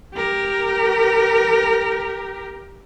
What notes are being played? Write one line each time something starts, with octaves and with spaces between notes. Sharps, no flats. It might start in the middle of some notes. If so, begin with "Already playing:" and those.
G4 A#4